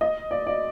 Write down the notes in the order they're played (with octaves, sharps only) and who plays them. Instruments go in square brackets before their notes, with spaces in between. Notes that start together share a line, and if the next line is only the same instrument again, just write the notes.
[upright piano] D#5
D5
D5